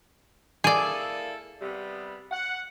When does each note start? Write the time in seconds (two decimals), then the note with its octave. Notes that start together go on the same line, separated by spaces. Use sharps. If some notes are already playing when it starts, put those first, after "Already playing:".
0.64 A#3 E4 G#4 A4 D5
1.61 C3 G3 B3
2.31 F#5